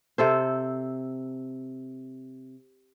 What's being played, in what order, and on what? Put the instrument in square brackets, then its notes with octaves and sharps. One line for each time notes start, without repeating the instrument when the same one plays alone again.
[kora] C3 A4 C5